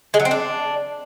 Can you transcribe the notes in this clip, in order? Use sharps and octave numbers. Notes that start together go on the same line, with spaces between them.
G#3
F#3
C4
D4